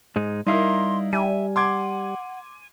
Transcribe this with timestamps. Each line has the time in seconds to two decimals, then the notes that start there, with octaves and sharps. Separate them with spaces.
0.16 G#2 G#3 D#4
0.47 G3 D#4 E4 A#4 F5 C6
1.13 G3 E5 G#5
1.56 F#5 C6 D6 G#6